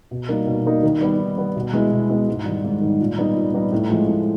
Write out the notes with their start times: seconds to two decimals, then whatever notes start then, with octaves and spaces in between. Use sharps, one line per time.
0.11 B2
0.29 G3 A#3 D#4
0.47 B2
0.66 G3 A#3 D#4
0.83 D#3
1.01 G3 B3
1.19 D#3
1.38 G3 B3
1.56 B2
1.73 G#3 B3 E4
1.91 B2
2.10 G#3 B3 E4
2.28 G#2
2.45 D#3 G3
2.64 G#2
2.81 D#3
2.86 G3
3.01 A#2
3.18 G3 B3 D#4
3.35 A#2
3.54 G3 B3 D#4
3.72 A2
3.90 F3 G#3
4.08 A2